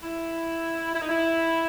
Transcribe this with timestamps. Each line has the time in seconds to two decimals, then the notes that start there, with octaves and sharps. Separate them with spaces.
0.03 E4
0.95 E4
1.02 D#4
1.09 E4